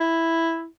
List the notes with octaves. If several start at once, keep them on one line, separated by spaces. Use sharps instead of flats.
E4